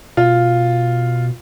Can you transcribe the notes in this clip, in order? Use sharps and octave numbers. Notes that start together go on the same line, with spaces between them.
B2 F4